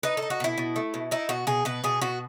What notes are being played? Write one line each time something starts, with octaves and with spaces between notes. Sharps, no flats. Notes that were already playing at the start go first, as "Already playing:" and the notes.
D#4 B4
A4
D#4
F#4
B2 E4
B2
A3
B2
D#4 E4
B2 F#4
B2 G#4
B2 B4
B2 G#4
B2 F#4